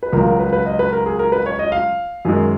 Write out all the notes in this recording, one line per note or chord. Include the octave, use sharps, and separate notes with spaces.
B4
C#2 C#3 F#3 A#4
A#4
B4
B4
D#5
B4
A#4
G#4
A#4
B4
C#5
D#5
F5
F#2 D#3 G#3